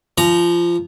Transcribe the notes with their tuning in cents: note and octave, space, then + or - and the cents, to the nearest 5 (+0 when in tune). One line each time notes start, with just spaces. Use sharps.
F3 -20 A#5 +0